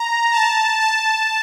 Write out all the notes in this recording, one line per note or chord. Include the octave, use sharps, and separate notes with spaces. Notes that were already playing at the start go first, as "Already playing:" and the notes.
Already playing: A#5
A5
A5